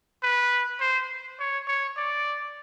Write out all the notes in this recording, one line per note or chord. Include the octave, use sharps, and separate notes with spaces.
B4
C5
C#5
C#5
D5